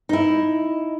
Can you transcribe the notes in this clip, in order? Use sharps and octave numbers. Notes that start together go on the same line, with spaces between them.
D#4 E4